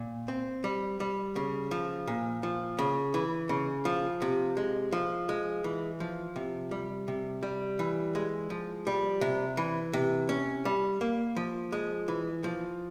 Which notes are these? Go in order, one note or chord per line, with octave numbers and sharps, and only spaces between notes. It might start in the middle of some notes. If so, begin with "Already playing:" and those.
Already playing: A#2
C4
G3
G3
C#3
F3
A#2
F3
C#3
E3
C#3
F3
C3
G#3
F3
G#3
E3
F3
C3
G3
C3
G3
E3
G#3
F3
G3
C3
E3
C3
C#4
G3
A#3
F3
G#3
E3
F3